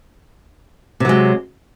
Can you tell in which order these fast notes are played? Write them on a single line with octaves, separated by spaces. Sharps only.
C3 F#3 G#3